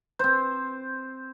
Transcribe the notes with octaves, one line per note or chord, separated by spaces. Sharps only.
C4 C5